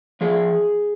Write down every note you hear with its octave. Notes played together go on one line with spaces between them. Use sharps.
F3 G#4